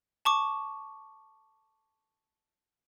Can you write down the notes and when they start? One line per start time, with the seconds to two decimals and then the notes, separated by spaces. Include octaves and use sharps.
0.25 A5 C#6 D6